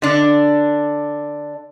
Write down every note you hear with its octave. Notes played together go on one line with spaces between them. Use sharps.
D3 D4